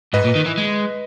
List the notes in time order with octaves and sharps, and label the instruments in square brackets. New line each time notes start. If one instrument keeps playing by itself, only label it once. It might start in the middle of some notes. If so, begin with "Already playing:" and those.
[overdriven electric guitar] G#2 [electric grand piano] B4 D#5
[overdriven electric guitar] A#2
D#3
E3
G#3